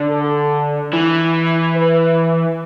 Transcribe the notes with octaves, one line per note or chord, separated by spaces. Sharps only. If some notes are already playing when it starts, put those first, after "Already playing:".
Already playing: D3
A4
E3
B4